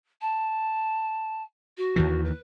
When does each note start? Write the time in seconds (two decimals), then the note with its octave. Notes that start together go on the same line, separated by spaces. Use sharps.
0.21 A5
1.77 F#4
1.96 D#2 D#3 E3
2.24 B4